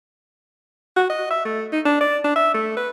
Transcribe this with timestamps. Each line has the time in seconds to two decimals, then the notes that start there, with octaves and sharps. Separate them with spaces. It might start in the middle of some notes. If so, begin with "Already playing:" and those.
0.96 F#4
1.10 D#5
1.31 E5
1.45 A3
1.72 D#4
1.85 D4
2.01 D5
2.24 D4
2.36 E5
2.54 A3
2.77 B4